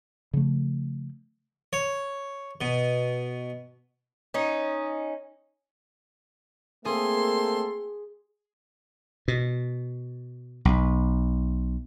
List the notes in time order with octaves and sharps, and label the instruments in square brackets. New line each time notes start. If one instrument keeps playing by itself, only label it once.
[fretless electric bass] C#3 F3 A3
[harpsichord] C#5
B2
[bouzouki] C#4 D#4
[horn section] A3 C4 A4 [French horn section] A#3 [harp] G#4 [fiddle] C6
[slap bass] B2
B1